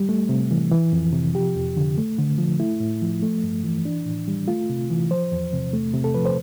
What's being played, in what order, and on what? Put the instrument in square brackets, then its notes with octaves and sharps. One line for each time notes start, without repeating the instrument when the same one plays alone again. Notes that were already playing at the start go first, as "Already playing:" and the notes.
Already playing: [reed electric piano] G3
A3
C3
E3
E3
F2
C3
F3 G4
F2
D3
A3
D3
F3
A3 E4
A2
F3
A3
G2
E3
D4
A2
G3
A3 F4
C3
E3
F3 C5
E2
C3
A3
C3
A4
F3 B4
C5